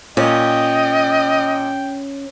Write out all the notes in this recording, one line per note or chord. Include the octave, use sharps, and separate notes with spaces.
A#2 C#4 D#5 G5